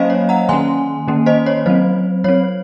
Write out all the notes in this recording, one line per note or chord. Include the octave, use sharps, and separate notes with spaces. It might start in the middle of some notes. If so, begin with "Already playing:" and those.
Already playing: F#3 A#3 C#4 C5 D#5 F5 G#5
C#5
F#5 A#5
D#3 A#3 C#4 G#5 C6
D#3 A#3 C#4
C5 D#5
C#5
F#3 C4 C5
F#3 C4 C#5